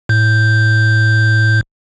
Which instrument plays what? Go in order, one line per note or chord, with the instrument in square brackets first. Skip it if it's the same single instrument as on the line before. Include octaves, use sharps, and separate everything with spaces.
[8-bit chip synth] A2 G6